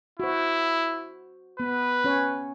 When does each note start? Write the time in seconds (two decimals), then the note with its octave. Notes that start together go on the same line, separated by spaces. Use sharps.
0.20 E4 F#4 C5
1.60 B3 B4
2.04 C#4 C#5